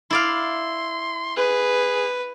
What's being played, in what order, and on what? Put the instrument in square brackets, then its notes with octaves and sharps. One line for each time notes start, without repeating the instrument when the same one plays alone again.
[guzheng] E4 D5 F5 [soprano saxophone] C6
[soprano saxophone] G#4 [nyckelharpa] B4